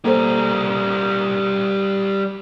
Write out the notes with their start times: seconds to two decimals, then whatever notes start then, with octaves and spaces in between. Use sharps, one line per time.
0.05 G3 A#3 A4 A#4 C5